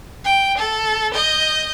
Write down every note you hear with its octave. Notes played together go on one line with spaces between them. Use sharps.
G5
A4
D#5 G6